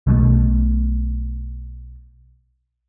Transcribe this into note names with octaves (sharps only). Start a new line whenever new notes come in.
B1 B2 D#3 A3